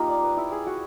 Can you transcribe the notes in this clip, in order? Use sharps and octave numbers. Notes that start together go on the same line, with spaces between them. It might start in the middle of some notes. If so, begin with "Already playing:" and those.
Already playing: A#3 D#4 F4 G4
D5
B4
E4
G#4
F#4